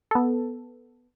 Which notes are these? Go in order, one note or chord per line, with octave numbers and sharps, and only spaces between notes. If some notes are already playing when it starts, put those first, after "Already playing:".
B3 A4